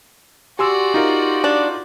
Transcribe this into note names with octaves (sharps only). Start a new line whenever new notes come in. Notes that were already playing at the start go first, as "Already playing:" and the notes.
F#4 G4 D5 G#5 C6 E6
D#4 F4 A#4
D4